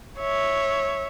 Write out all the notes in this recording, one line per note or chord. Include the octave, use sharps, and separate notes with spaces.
C#5 E5